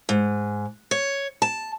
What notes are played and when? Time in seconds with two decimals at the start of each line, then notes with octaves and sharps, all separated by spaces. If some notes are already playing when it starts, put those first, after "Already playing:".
0.09 G#2
0.91 C#5
1.42 A5